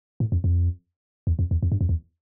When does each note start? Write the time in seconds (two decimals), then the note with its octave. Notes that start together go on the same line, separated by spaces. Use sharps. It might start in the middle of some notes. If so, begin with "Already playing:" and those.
0.20 A2
0.32 F2
0.44 F2
1.27 E2
1.39 F2
1.51 E2
1.63 F2
1.72 G2
1.81 F2
1.89 E2